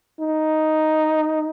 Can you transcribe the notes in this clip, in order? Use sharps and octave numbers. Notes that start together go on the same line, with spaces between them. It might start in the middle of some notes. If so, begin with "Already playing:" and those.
D#4